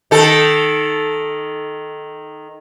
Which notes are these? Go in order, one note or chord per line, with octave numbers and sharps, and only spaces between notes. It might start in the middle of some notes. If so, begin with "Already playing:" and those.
D#3 A4